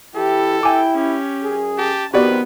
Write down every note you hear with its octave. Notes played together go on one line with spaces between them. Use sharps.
E3 E4 G4 A4
E4 G5 G#5 D6
C#4 G4
F#2 G#4
G4 A5
D#3 F3 B3 C4 F#4 G4 B4 D5